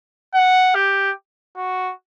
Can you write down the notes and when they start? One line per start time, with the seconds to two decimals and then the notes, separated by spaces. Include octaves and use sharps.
0.34 F#5
0.75 G4
1.57 F#4